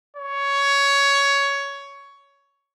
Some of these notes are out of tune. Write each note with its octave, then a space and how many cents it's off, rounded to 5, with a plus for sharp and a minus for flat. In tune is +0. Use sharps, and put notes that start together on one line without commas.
C#5 +15